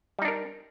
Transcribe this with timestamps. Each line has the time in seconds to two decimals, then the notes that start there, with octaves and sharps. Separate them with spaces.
0.19 G3
0.22 D#4
0.25 D4
0.28 A#4